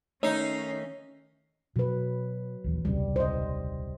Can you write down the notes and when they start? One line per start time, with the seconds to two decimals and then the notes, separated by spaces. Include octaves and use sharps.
0.23 D#3 A3 C#4 D#4 C#5 C7
1.76 B2 F#3 B4
2.64 A#1 D#2 E3
2.85 D#1 C2 C#3 G3
3.16 C5 D#5